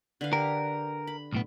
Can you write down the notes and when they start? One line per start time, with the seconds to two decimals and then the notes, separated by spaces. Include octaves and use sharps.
0.21 D3 B4 F5
0.33 G4 A#4
1.07 B5
1.32 B1 A2 B3